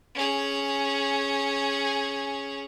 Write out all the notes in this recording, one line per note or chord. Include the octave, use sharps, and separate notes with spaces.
C#4 G#4